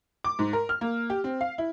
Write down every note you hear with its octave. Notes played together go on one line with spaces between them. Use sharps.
D6
G#2
A#4
F6
A#3
G4
C4
F5
E4